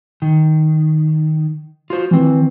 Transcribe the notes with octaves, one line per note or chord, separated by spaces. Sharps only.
D#3
F4 F#4 C5
D#3 E3 C4